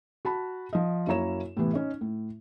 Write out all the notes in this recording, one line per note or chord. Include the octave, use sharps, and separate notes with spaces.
F#4 A5 B5
F3 D#5
F#2 A#3 E4 C#5 A#5 E7
A2 C3 E3 B3
C#4 D#4
A2